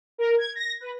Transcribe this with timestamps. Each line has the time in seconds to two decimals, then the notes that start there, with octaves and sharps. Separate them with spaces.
0.18 A#4
0.38 G#6
0.55 A#6
0.80 B4